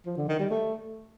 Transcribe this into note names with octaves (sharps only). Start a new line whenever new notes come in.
F3
D3
D#3
G3
A3